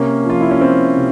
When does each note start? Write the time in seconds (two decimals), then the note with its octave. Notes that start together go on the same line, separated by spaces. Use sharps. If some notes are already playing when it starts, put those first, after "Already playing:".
Already playing: C3 A#3 C#4
0.24 F3
0.30 F4
0.41 E4
0.51 C#4
0.61 F3 C4
0.97 C3